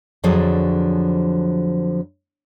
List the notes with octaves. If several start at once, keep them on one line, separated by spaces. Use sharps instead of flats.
F2 D3 F3 F#3 G#4 C#5